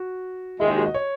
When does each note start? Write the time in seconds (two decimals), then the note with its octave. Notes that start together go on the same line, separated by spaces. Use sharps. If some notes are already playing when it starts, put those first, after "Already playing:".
Already playing: F#4
0.60 D#2 D#3 G#3 E4
0.68 D#4
0.78 F#4
0.86 D#5
0.94 C#5